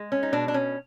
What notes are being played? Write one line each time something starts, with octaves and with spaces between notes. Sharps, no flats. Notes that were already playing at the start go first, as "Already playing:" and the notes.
Already playing: G#3
C#4
D#4
B2 D4
D4
C#4